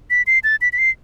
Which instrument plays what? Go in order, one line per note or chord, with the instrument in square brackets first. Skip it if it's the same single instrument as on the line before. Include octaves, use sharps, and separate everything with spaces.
[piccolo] B6
C7
A6
B6
B6
C7